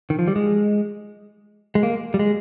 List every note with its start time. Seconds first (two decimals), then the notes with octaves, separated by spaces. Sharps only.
0.10 D#3
0.19 F3
0.28 G3
0.36 G#3
1.75 G#3
1.83 A#3
2.14 G3
2.19 G#3